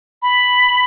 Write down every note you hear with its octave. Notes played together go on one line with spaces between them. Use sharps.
B5